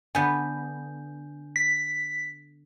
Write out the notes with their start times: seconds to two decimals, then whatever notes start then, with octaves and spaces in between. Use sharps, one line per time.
0.15 D3 B3 G#5 G6
1.56 B6